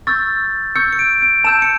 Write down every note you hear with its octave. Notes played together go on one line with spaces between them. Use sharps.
C#6 E6 G6 A6
C#6 E6 G6 C#7
C#7
D7
D7
A5 E6 G6 E7
C#7